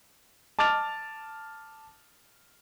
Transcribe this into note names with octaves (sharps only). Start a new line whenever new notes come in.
A5 D6 F6 A6 F7